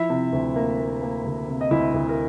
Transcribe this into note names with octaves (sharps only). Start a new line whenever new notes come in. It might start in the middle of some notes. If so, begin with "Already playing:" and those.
Already playing: F3 E4 E5
C3
D2
A#3
A#3
A#3
D2
C3
D#5
D2 E4 E5
D2
A#4